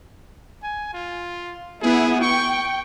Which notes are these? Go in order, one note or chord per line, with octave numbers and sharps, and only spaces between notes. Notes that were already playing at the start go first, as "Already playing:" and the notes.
G#5
F4
B3 E4 G#4
G5 C#6